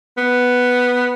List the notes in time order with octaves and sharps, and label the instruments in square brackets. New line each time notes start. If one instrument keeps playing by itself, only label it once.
[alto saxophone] B3